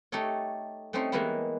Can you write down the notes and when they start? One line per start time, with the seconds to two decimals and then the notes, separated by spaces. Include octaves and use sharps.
0.12 A3 D#4 G4 A4 C#5
0.93 A3 C4 C#4 D#4 C5
1.12 E3 G#3 A#3 B3 D#4 E4